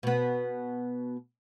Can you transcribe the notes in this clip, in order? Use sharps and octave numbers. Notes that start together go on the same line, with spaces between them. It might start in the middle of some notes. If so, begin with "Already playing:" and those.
B2 B3